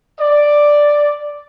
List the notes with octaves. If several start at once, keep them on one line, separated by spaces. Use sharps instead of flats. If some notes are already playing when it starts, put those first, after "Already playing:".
D5